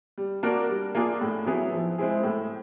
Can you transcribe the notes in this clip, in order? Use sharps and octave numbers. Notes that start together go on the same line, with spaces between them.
G3
A#3 D4 F#4 A#4
G3
A#3 D4 F4 G#4
A2
F#3 B3 E4 G#4
F3
G#3 C4 E4 G#4
A2